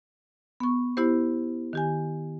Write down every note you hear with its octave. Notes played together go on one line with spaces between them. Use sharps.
B3 C#6
B3 E4 G4 C5
D#3 G4 G#5